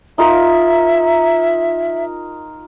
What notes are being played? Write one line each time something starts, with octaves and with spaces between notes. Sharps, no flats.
D#4 F4 A#4 E5